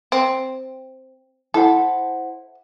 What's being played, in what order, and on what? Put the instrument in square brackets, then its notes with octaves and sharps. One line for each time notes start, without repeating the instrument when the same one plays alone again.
[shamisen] C4
[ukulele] E4 C5 F#5 [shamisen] A4